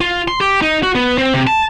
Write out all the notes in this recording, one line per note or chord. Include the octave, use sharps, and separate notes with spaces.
F4
C6
G4
D#4
F#4
B3
C4
C3
A5